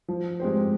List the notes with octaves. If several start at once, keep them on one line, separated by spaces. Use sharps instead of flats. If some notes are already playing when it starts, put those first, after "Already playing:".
F3
G#3 C4 G4 C5